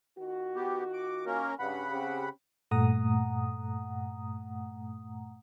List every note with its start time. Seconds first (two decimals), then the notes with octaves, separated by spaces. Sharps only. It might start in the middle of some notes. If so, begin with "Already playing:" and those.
0.18 D#3 F4 F#4
0.56 B3 G4
0.93 D6
1.26 A#3 C#4 A#4
1.59 G2 C#3 F#5 B5
1.91 C4 C#4 G4
2.71 G2 A#2 A3 F#5 A#5 D#6